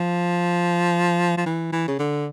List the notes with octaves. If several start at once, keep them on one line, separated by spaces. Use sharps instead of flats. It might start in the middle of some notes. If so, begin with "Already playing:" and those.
Already playing: F3
F3
E3
E3
C#3
D3